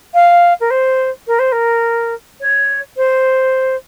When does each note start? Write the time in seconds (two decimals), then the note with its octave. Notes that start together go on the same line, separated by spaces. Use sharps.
0.14 F5
0.60 A#4
0.70 C5
1.27 A#4
1.39 C5
1.52 A#4
2.40 C#5
2.96 C5